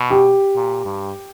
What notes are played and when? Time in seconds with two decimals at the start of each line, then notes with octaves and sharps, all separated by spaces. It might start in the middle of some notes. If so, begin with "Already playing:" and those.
Already playing: B2
0.11 G4
0.56 A#2
0.85 G2